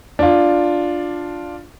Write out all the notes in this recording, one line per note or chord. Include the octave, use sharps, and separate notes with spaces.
D4 F4